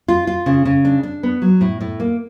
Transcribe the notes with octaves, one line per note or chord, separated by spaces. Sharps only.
F4
F4
C#3
C#3
D4
D4
B3
F#3
A2
A2
A#3